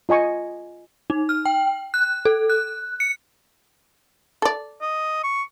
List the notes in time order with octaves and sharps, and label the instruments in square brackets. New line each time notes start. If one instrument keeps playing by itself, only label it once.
[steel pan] F4 D#5 G#5 C#6
[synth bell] D#4
F6
G5
F#6
A4
F#6
C#7
[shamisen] A4 D5
[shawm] D#5
C#6